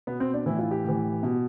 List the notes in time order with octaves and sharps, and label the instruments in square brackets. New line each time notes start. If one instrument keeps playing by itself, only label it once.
[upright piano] B2 B3
C4
D4
A2 E3 E4
F4
G4
A2 E3
B2